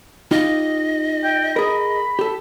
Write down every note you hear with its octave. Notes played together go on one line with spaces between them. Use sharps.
D#4 F4 G4 D#5
G5
G#4 A#4 B5
G4 A4